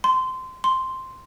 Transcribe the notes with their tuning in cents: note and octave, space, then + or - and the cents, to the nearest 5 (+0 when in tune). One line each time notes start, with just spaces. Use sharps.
C6 -20
C6 +0